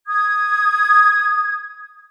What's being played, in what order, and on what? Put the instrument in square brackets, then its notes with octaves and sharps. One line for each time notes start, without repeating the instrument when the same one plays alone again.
[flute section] D#6 G#6